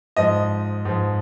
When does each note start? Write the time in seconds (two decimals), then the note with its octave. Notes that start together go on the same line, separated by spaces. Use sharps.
0.16 G#2 F3 D#5
0.85 G#2 F3